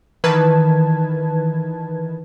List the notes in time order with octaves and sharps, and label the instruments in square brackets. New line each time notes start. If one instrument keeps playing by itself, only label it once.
[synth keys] D#3 E3 B4 A5 G#6